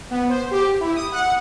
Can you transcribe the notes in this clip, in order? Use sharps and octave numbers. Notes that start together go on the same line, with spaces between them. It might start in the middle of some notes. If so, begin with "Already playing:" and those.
B3
C5
G4
E4
D#6
F#5